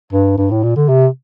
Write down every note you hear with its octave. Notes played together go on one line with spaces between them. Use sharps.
G2
G2
A2
A#2
D3
C3